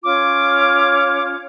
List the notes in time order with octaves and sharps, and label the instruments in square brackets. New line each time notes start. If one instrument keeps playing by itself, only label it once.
[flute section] C#4 F4 C#5 [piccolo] D6